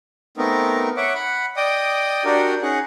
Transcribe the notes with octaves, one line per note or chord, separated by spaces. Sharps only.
A3 B3 C4 D#4 A#4
C#5 E5 F#5 D6
F#5 B5
D5 D#5 G5 D#6
D4 F#4 G4 A#4 D5 D#5
C#4 D#4 G#4 F#5